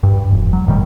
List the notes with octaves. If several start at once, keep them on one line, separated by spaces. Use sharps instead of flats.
G2
E1
F#3
E1 A2 D#3 G3